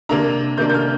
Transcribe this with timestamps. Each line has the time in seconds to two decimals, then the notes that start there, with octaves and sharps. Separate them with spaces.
0.09 C3 A#3 D4 A#5
0.58 C3 A#3 D4 G6
0.69 G6
0.74 F6